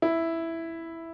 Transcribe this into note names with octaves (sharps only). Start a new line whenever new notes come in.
E4